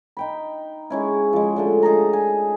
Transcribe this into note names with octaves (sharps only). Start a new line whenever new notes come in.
D#4 G5 B5
G#3 C#4 E4
F3 G#3
D3 G#3 A3
D#4 G#4 A4 A#5
G#5